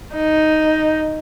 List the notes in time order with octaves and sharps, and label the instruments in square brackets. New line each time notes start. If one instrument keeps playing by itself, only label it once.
[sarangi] D#4